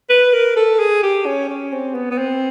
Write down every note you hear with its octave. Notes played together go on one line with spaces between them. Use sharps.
B4
A#4
A4
G#4
G4
C#4
C#4
C4
B3
B3
C4